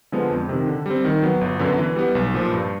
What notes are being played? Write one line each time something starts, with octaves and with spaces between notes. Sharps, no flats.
D3 F3 G#3 B3
F2
C3 D#3
D3
G3 C4
D#3
F#3 B3
G1
F#2 D3 F#3 B3
E3
G3 B3
B1
A#2 F3
G2